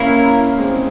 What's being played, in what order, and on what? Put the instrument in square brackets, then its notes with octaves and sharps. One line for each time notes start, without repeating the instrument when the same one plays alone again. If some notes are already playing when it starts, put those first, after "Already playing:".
Already playing: [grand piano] A#3 C#4 [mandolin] E4 A#4 F5
[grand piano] G#3 C4